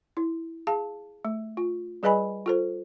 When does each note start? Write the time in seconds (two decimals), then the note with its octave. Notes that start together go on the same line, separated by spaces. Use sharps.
0.17 E4
0.67 G#4 F5 A5
1.25 A3
1.57 F4
2.03 G3 G#4 B4 D#5 G#5 B5
2.46 F4 A4 C5